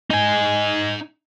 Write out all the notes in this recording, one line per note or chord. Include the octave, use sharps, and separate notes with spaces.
D#4 G#5